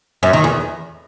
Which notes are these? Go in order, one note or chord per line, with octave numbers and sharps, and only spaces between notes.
F#2
D#3
E2